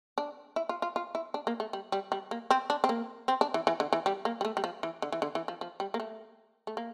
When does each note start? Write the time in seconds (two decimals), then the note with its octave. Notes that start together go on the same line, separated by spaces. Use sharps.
0.18 D4
0.56 E4
0.69 F4
0.82 F4
0.96 F4
1.15 E4
1.34 D4
1.47 A#3
1.60 A3
1.73 G3
1.92 G3
2.12 G3
2.31 A#3
2.51 C4
2.70 D4
2.84 C4
2.89 A#3
3.28 C4
3.41 D4
3.54 E3
3.67 E3
3.80 D3
3.93 E3
4.06 G3
4.25 A#3
4.41 G3
4.45 A3
4.57 G3
4.64 F3
4.83 E3
5.02 D3
5.12 E3
5.22 D3
5.35 E3
5.48 F3
5.61 F3
5.80 G3
5.94 A#3
6.00 A3
6.67 A3
6.77 A#3